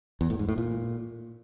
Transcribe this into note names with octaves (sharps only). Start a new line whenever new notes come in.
E2
A2
G#2
A2
A#2